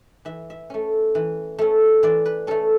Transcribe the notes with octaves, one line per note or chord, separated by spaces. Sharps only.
E3 E5
E5
A3 C#4
E3
A3 C#4
E3 D5
B4
A3 C#4 A4